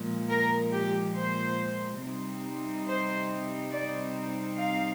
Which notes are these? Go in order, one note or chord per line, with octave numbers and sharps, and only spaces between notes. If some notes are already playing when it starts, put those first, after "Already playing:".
Already playing: A#2 F3 G#3
A#4
G4
C5
C3 G3 C4 D#4
C5
D5
F5